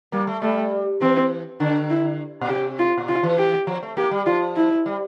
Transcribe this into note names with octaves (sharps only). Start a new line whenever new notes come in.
G3 A#3
A3
G3 A3
E3 C4
D3 D4
E4
A#2
C3 G4
F4
A#2
C3 F4
E3
G4
F3
A3
A#3 G4
G3
F3 F4
E4
G3